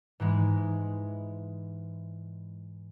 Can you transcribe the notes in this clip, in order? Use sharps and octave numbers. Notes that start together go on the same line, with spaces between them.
G#2 E3 G#3